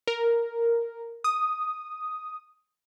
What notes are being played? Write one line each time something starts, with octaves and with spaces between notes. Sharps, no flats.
A#4
D#6